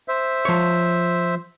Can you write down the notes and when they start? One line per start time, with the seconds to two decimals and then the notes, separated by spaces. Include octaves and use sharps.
0.08 C5 E5
0.45 F3 C#5